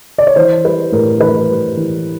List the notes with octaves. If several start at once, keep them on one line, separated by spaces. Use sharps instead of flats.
D5
C#5
E3 C5
G3 B4
A2 A#4
E3 B4
G3
E3